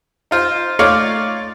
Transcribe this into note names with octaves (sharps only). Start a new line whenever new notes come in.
D#4 F4 C5
A3 D#4 F4 C#5 D5 F5